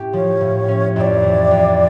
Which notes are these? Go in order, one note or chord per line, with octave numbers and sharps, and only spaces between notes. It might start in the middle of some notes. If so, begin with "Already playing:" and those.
Already playing: A2 C#4 G4
F3 C#5
A2
C#4
F2 E5
D5
E3
F2